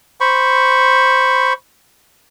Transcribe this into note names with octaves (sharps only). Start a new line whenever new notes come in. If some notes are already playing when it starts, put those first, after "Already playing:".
C5 B5 C#6